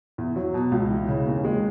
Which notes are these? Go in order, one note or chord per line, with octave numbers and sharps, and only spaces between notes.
E2
F#3
B2
C#2
E3
C#3
D#2
G#3